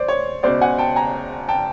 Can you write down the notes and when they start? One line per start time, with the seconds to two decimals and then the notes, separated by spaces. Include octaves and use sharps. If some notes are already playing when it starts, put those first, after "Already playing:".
Already playing: C5 D5
0.08 C#5
0.43 C#2 B2 C5 D5
0.61 F#5 G#5
0.78 G5 A5
0.96 G#5 A#5
1.49 G5 A5